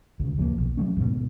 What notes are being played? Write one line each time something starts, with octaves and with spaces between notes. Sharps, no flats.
D2 C#3
D#2 F3 G3 A#3
B1
F#3 G#3 A3 C#4
D#2 G#2 B2